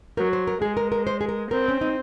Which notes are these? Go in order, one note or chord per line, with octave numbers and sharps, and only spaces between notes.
F#3 A#4
C5
A#4
G#3 G#4
A#4
A#4
C5
G#4
A#4
C4 A#4
C#4
D#4